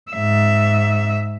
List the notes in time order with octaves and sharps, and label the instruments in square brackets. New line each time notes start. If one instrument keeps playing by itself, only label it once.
[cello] G#2 E5